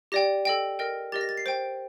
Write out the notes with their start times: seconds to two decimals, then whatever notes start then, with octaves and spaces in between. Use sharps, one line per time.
0.12 G4 D5 G5 A#6
0.45 A4 D#5 G5
0.79 A#4 D#5 G5
1.12 G4 A#4 D#5 A6
1.21 A#6
1.29 A6
1.37 C7
1.46 C5 G5 D7